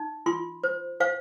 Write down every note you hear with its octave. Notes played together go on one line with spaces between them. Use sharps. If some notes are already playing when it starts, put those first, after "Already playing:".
Already playing: D#4
F4 C6
C5
C5 F5